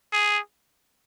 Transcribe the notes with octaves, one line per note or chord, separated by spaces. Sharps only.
G#4